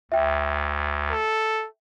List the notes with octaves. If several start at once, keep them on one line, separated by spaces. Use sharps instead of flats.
D2 E5 G5
A4